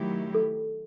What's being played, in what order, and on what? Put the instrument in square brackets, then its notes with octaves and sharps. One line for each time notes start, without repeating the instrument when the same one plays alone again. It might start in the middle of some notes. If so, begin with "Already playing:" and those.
Already playing: [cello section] D#3 F#3 A3 E4 G4
[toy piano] A4